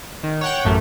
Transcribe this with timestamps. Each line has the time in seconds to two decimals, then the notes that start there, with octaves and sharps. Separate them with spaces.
0.23 D#3
0.41 C#5 F#5 G5
0.64 A1 F#2 A3